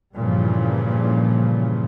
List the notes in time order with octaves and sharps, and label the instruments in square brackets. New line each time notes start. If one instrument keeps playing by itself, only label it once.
[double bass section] G2 A#2 C#3 E3 F3